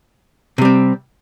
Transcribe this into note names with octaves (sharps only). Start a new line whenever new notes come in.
C3 G3 C4